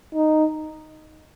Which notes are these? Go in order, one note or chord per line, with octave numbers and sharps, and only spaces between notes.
D#4